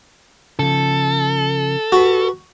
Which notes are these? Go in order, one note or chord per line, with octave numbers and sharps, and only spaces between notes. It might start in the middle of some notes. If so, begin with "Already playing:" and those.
C#3 F3 A4
F#4 G4 B4